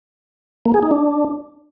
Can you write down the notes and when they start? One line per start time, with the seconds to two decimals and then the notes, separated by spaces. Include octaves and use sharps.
0.66 A#3
0.74 G#4
0.83 D#4
0.91 D4